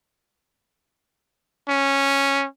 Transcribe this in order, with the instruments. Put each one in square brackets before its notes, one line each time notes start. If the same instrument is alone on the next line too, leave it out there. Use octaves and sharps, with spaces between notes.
[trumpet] C#4